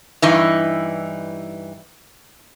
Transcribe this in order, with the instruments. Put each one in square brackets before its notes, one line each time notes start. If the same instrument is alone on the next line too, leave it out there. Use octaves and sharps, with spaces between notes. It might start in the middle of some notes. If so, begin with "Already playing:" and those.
[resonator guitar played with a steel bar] G2 E3 D#4